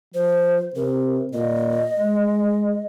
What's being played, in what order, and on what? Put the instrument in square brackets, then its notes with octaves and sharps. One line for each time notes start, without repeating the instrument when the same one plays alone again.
[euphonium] F3 [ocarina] C5
[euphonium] C3 [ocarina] A#4
[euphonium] A#2 [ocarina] D#5
[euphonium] G#3